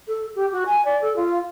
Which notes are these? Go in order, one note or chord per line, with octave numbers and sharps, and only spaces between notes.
A4
G4
F#4
G#5
D5
A4
F4